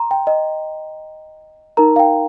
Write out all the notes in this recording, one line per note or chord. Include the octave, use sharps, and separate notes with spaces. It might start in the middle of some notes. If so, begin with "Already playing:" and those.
Already playing: A#5 C6
G5
D#5
D#4 A#4 A#5
F5
G5